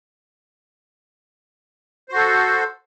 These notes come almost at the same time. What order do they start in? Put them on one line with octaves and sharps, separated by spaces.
C5 F#4 A4